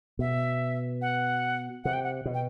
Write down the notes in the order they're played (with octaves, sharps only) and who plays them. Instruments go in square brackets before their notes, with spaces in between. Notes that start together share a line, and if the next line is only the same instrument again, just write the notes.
[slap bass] B2 [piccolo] E5
[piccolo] F#5
[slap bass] C3 [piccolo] F#5
[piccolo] G5
F#5
[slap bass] B2
[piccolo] G5